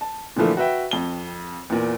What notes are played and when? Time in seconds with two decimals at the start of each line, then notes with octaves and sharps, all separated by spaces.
0.01 A5
0.36 A#2 D3 E3 F3 A3
0.57 F#4 B4 E5 G5
0.91 F2 G7
1.70 E2 A#2